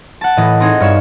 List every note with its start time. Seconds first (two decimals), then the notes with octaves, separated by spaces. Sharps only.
0.21 F#5 A5
0.37 A2 E3 D#5
0.60 C4 D#4 G#4 C5
0.80 G2 C#5 E7